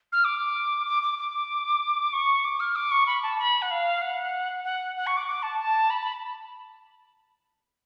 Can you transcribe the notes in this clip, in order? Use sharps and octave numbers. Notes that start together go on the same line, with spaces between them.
F6
D6
D6
D6
D6
C#6
D6
F6
D6
C#6
B5
A5
B5
F#5
F5
F#5
F#5
F#5
C#6
D6
D6
A5
A5
B5
B5